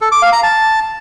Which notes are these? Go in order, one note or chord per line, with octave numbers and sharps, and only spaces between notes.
A4
D6
F5
A#5
A5